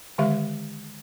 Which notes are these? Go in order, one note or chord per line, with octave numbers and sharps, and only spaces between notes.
D3 D#3 G#3 G4 E5 F5